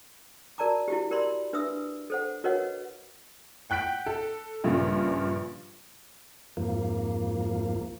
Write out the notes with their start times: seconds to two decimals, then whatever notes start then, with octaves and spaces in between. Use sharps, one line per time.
0.58 F#4 A#4 D5 A5 A#5 D6
0.88 E4 F#4 G4
1.11 G4 A#4 D5 B5 C6
1.53 D4 B4 E5 D#6 E6
2.10 A4 C5 F#5
2.44 F#4 A#4 B4 C#5 D#5 F#5
3.70 F#5 G5 F#6 B6 D7
4.06 A4
4.64 A#1 G2 A#2 C#3
6.57 F2 G#2 F3 A#3